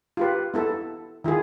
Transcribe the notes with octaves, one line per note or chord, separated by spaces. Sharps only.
F4 G4 B4
B3 E4 A4
D#3 E4 F4 G#4